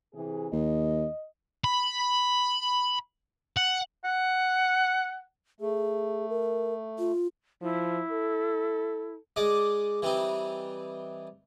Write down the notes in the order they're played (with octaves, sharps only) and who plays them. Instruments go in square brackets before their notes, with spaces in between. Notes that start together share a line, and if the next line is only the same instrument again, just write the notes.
[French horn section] C3 E3 G#4
[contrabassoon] D#2 [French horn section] D#5
[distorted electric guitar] B5
F#5
[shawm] F#5
[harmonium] A3 [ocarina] G#4
[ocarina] A#4
F4
[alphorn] F3 [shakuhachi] E4
[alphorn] A4
[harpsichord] G#3 D5 D#5
E3 G3 C4 D#4